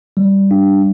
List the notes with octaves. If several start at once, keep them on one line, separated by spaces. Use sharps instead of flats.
G3
D4